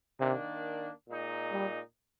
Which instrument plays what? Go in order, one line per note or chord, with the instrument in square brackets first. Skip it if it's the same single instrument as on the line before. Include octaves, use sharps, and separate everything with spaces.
[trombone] C3 [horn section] D#3 A#3 D4
[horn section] A#2 G#3 D#4
[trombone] G3